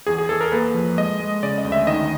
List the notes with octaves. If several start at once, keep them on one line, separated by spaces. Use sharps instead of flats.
E2 G#4
G#4
E2 A4
A#4
A#3 B4
F3
G#3 D#5
G#3
C#3 D5
D#5
D2
E5
D#3 D#5